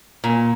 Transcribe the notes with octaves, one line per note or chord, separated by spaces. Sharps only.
A#2